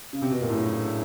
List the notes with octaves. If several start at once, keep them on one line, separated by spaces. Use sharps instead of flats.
C#3
C3
B2
A#2
A2 C#3 F#3 A3 D4